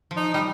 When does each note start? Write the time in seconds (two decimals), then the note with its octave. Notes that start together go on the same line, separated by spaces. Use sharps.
0.11 F3
0.17 D#4
0.34 G3 D#4